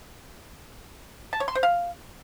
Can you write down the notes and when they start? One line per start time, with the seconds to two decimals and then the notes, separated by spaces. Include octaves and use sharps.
1.33 A5
1.40 C#5
1.48 C6
1.55 C5
1.63 F5